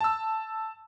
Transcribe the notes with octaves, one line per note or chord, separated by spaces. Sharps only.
A5 E6